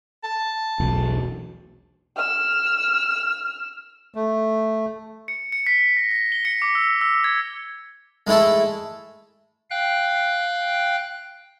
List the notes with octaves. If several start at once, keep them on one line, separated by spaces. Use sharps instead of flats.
A5
E1 B1
E6 F6
A3
C#7
C#7
B6
A#6
A#6
G7
C#7
D6
E6
E6
G#6
G#3 A3 E4 A4 E5
F5 G5 F#6